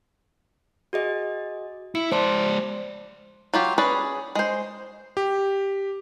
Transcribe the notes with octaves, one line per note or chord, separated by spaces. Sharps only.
F#4 G#4 D#5
E4 C#7
G#3 C5 D5 A5 C6
F#3 F4 G4
C#4 G#4 B4 D5
G#3 C5
G4